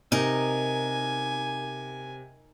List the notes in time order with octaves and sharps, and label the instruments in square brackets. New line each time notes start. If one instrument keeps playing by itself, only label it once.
[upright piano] C3 [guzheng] D#4 A#4 [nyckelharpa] G#5